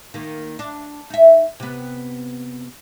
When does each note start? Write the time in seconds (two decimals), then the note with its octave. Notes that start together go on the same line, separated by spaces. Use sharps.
0.14 D#3 A#3
0.59 D4
1.10 D#4 E5
1.60 C3 B3